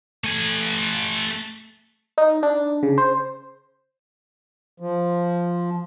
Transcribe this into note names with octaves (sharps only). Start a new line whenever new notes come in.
A3 G#5
D#4
D4
C#3
C5
F3